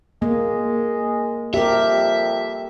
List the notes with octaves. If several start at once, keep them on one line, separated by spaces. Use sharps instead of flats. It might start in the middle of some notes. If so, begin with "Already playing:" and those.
G#3 A#3
F2 G4 A#4 E5